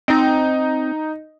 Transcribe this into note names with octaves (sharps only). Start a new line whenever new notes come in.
C4 D#4 D#5